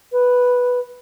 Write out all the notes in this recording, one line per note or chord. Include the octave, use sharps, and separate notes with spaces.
B4